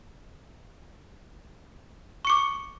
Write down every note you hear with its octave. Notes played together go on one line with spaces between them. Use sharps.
C#6 D6 C#7